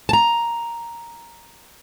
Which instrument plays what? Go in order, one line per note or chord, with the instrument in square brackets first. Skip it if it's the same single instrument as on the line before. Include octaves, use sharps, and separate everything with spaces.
[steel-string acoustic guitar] A5 A#5